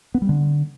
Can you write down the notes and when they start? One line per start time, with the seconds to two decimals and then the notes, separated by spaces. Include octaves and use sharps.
0.14 B3
0.22 G3
0.29 D3